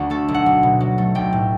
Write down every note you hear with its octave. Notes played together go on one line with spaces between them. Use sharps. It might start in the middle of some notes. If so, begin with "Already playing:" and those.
Already playing: D2 D3 F#4
A3 A4
B1
F#5
B1
B2
F#3
A3
B1 G5
A2